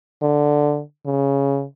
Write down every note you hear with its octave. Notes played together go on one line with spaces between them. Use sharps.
D3
C#3